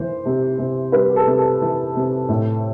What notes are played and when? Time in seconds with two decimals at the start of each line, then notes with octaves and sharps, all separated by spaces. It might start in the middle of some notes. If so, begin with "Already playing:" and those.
Already playing: E3 C5
0.26 C3
0.58 C3
0.92 G3 B4
1.09 G4
1.16 A4
1.27 C3
1.38 A4
1.61 E3
1.96 C3
2.29 A2